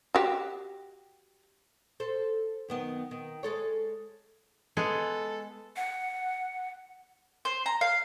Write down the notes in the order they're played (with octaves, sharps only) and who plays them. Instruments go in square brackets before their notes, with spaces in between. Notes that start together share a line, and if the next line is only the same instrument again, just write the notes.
[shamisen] F#4 G4
[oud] A4 C5
F#2 D#3 B3
D#3
G#3 A4 C#5
[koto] G#3 B3 G#4 [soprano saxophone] A4
[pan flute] F#5
[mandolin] C5
A#5
F5